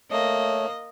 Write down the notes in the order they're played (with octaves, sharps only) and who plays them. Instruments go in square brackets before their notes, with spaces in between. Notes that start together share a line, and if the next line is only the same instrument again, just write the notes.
[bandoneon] A3 [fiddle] A#3 [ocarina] C#5 [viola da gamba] D#5